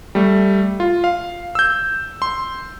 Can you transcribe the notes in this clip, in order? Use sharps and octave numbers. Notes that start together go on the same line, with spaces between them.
G3 A3
F4
F5
E6 G6
C6